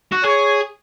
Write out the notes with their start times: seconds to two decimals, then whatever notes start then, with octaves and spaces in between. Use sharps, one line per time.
0.12 F#4
0.24 G#4 C#5